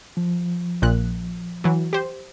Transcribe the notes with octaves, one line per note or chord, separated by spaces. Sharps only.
F3
A#1 A#2 F#6
E3 F#3
G4 C5